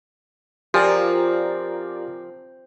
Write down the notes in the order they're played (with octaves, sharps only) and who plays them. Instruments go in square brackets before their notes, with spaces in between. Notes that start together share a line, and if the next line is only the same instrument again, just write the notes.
[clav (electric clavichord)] F3 [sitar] C4 [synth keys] F4 A#4 D5 [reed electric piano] G4 G#5